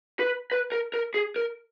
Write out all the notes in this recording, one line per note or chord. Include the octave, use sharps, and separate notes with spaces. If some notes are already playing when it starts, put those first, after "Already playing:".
B4
B4
A#4
A#4
G#4
A#4